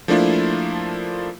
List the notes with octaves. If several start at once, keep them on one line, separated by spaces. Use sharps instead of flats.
F3 A3 A#3 D4 E4 F4